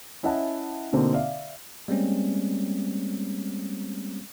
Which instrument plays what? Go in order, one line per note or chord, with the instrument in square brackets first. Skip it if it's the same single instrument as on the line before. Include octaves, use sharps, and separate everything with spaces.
[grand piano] C#4 E4 D#5 E5 F#5 A5
B2 D3 A#3 C4 D#4
D5 E5 F5
[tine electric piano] G3 G#3 A#3 C4 C#4